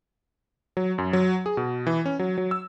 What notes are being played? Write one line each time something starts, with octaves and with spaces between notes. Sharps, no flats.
F#3
F#2
F#3
G#4
B2
E3
C#4
F#3
F#3
E6